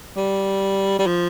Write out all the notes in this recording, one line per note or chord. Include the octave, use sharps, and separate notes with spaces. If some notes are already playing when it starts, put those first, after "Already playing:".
G3
G3
F3